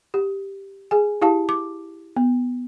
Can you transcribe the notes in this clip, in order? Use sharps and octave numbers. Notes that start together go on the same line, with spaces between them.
G4
G#4 G#5
E4 G4 F5 A5
D6
B3